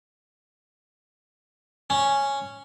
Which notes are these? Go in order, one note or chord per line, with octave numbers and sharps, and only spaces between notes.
C#4